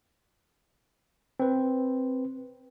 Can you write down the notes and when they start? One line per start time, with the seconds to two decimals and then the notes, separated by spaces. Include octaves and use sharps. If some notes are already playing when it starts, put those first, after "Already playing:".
1.40 C4 B4